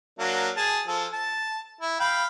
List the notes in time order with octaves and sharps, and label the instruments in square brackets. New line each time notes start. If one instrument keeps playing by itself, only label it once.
[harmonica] F#3 A#3 D4
G#4 A5
F3 A4
A5
E4
F5 G5 B5